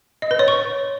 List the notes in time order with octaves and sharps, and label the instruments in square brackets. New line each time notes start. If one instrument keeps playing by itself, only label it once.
[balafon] D#5
B4
C#5
C#6